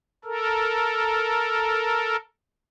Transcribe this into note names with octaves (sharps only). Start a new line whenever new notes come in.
A4 A#4